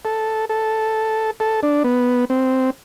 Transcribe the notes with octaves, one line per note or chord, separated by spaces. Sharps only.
A4
A4
A4
D4
B3
C4